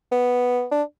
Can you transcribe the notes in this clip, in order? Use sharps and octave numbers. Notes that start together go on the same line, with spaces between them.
B3
D4